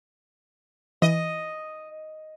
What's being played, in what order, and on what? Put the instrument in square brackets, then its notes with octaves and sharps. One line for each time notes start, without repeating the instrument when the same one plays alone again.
[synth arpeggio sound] E3 [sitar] D#5